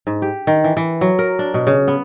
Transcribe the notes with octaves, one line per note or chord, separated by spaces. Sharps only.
G#2
G4
D#3
E3
E3
F#3
A#4
D4
B2
C#3
B3